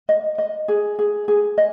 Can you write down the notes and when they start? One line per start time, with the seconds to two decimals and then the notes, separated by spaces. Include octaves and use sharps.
0.09 D#5
0.38 D#5
0.68 G#4
0.99 G#4
1.28 G#4
1.58 D#5